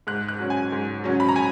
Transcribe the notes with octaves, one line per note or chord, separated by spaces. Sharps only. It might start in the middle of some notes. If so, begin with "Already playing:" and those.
G#2 F#6
F#6
F#3 C#4
G#5
G#2
F#3 C#4
B5
A#5
G#5